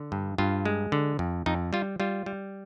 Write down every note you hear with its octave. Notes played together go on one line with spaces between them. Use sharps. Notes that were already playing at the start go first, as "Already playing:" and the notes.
Already playing: D3
G2
G2 F4
G#3
D3
F2
F2 D#4
G3 F4
G3 F4
G3